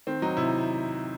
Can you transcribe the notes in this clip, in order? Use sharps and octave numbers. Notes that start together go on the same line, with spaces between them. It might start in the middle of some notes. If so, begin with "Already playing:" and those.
D#3 C4
F#3 D#4
C3 E4